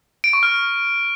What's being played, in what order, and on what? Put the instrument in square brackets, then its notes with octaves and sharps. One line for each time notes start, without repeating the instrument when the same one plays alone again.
[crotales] D7
C#6
F6